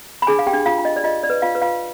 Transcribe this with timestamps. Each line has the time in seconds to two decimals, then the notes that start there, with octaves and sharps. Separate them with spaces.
0.22 B5
0.27 D4 G#4 G#5
0.39 F5
0.47 G4 G5
0.53 D4
0.66 F4 F5
0.78 F4
0.85 D#5
0.96 D5
1.04 F4 D#5
1.23 D5
1.30 B4
1.42 F4 F5
1.55 B4
1.62 F4 F5